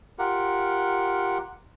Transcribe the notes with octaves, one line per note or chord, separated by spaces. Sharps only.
F4 G4 A#4 F#5